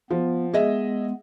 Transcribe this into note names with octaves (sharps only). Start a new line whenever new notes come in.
F3 B3
G#3 B3 G#4 D#5 E5